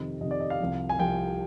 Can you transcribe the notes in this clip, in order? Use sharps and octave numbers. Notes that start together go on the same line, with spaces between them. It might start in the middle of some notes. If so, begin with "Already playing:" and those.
Already playing: F2 C3 D#3
F2 C3 D#3 D#5
D5
D#5
F5
C2 C3 F3
G#5
C2 C3 F3 G5